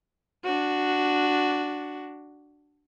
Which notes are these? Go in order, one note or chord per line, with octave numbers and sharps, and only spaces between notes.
D4 F#4